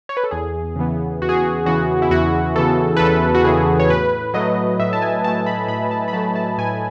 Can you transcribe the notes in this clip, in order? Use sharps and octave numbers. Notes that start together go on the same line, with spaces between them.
C#5
B4
A4
E2 G#4
C#3 E3 B3
E2 F#4
G#4
F#4
C#3 E3 B3 F#4
E4
E2 F#4
C#3 E3 B3 A4
B4
E2 A4
F#4
C#3 E3 B3 G#4
C#5
A2 B4
F#3 A3 D#5
A2 E5
A5
G#5
F#3 A3 A5
B5
A2 B5
A5
B5
F#3 A3 A5
A5
A2 G#5